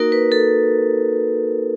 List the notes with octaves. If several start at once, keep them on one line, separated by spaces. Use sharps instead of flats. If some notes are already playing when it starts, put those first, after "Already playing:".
Already playing: A#3 D#4 F#4 A#4
B4
A4